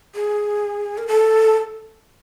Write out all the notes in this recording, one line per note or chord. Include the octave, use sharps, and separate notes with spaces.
G#4
A#4
A4